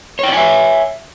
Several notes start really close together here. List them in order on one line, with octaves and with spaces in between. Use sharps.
C#5 G5 D5 G#5 E5